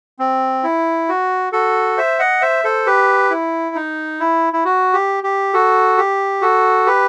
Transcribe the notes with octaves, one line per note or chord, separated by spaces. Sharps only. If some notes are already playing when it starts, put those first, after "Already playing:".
C4
E4
F#4
F#4 A4
C5 E5
D#5 F#5
C5 E5
A4 C5
G4 B4
E4
D#4
E4
E4
F#4
G4
G4
F#4 A4
G4
F#4 A4
G4 B4